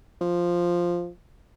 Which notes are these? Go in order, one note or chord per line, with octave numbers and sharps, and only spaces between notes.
F3